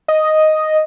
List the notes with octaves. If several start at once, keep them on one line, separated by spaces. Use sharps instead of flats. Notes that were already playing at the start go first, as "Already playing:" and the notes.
D#5